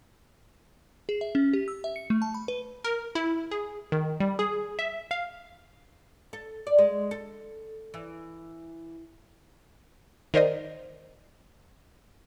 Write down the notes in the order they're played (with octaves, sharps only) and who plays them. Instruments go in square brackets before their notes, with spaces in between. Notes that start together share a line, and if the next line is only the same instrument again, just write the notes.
[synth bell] G#4
E5
C#4
G4
E6
E5
C#7
A3
A5
B5
B4
[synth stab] A#4
E4
G#4
D#3
G3
G#4
E5
F5
[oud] A4
D5
G#3
A4
E3
[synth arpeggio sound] D#3 A#4 C5 D5 D#5